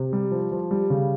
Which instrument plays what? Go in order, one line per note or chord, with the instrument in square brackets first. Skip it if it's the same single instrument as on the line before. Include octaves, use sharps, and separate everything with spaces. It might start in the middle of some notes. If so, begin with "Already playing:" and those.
Already playing: [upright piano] C3
G3
F3
F3
G3
C#3